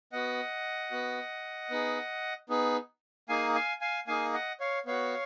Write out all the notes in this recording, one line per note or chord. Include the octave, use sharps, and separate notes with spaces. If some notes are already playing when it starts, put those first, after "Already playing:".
B3 F#4 D#5 F#5
B3 F#4
B3 D#4 G#4
B3 D#4 G#4
A#3 D#4 G#4 F5 G#5
F5 G#5
F5 G#5
A#3 D#4 G#4 F5 G#5
D#5 F#5
C#5 F5
B3 F#4 C#5 F5